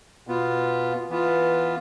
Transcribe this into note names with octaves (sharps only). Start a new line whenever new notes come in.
B2 B3 F4
E3 B3 F4